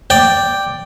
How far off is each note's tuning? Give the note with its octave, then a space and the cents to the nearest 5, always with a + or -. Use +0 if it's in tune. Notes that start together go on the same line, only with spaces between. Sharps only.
D5 +0 G5 +0